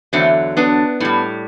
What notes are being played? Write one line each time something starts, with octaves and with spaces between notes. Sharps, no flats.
E2 D3 F#3 A3 C4
B3 D4
A2 G3